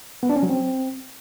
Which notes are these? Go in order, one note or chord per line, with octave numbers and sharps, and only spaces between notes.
B3
D4
C#4
F#3
C4